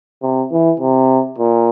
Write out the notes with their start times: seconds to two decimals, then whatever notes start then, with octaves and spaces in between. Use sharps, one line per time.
0.22 C3
0.52 E3
0.80 C3
1.38 A#2